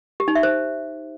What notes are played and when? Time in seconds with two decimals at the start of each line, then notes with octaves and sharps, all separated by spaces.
0.20 G4
0.28 D#4
0.35 E5
0.43 C5